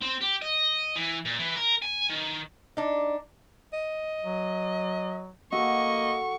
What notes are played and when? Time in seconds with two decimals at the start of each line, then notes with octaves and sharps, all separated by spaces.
0.01 C4
0.21 G4
0.42 D#5
0.96 E3
1.25 A#2
1.39 E3
1.56 A#4
1.82 G#5
2.09 D#3
2.77 D4 D#4
3.73 D#5
4.23 F#3
5.52 A#3 F#4 A4 D#5 C#6